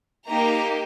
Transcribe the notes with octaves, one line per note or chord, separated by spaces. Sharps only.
A#3 D#4 G4 A#5